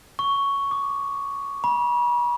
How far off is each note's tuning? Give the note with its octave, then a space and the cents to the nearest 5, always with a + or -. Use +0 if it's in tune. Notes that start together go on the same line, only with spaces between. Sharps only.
C#6 +5
D6 +0
B5 -40